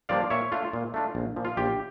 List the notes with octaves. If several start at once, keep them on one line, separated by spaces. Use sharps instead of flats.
G2 F3 A#3 D4 D5 F5
A#2 C#5 E5
A3 D4 F4
A#2
A3 D4 F4
A#1
A#2 F3
F4
A#1 G4